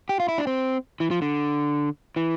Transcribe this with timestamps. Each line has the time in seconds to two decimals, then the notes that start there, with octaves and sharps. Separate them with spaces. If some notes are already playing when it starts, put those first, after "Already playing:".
0.09 G4
0.20 F4
0.28 E4
0.38 D4
0.47 C4
1.00 E3
1.11 F3
1.22 D3
2.16 E3